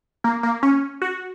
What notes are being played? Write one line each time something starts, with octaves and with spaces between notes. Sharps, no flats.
A#3
A#3
C#4
F#4